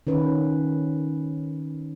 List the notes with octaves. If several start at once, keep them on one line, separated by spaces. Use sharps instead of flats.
D#3 C#4 B4